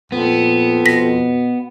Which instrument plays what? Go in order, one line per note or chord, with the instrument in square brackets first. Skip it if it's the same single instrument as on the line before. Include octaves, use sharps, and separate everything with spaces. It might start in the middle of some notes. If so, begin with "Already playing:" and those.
[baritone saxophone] F2 [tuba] A#2 [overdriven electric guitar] B3
[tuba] B2 [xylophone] A#6 B6